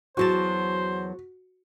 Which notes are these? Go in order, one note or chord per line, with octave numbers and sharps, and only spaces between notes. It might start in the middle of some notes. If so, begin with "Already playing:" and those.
E2 F#3 F#4 C5 A5